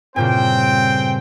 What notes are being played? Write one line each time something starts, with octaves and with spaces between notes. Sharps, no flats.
G2 A#2 C#3 C4 C5 G5